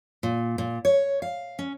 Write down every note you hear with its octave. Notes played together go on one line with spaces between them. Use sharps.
A#2
A#2
C#5
F5
C#4